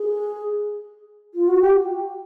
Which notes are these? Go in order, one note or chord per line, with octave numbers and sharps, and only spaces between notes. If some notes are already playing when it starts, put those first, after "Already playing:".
Already playing: G#4
F4
F#4
G4